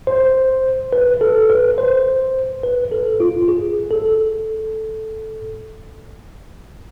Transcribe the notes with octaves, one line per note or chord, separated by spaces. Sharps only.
C5
B4
A4
B4
C5
B4
A4
F4
G#4
A4